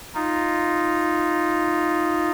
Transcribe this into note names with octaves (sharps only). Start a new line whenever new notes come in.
D#4 F4